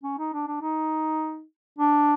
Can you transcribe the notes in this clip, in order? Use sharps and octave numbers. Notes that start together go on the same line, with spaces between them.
C#4
D#4
D4
D4
D#4
D4